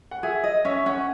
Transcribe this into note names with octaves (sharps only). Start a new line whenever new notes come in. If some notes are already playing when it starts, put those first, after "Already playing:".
F#5
G#4 E5
D#5
C#4 E5
C#4 F#5